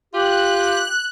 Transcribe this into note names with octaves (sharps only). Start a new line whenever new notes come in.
F4 G4 F#6